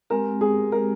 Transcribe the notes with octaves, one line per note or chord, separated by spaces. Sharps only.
G#3 C4 G4 A#4
G#4
G#3 C4 G4 A#4